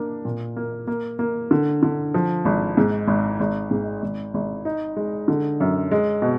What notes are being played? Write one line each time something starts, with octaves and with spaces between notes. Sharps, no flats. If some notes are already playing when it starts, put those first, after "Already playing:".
Already playing: A#3 D4
A#2
A#3
A#3
A#3
D3
D3
F3
G#1
G#2
G#1
G#1
G#2
G#1
G#1
D#4
G#3
D3
F#2
G#3
B2